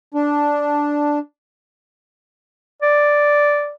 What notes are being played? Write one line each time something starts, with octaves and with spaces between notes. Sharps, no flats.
D4
D5